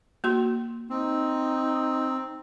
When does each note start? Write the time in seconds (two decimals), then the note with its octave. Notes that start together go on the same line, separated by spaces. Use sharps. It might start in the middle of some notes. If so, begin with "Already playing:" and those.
0.24 A#3 F#4 C6
0.90 C4 D#4